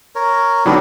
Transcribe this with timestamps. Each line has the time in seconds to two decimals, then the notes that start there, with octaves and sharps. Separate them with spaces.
0.15 A#4 C#5
0.66 D3 F#3 G3 B3 D4 D#4